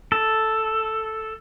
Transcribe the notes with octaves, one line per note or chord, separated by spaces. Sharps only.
A4